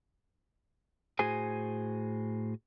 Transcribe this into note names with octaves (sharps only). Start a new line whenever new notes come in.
A2 F#4 G#4 C5 G#5